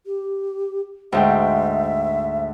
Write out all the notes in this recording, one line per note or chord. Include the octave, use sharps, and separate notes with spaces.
G4
D2 G#2 E5 G5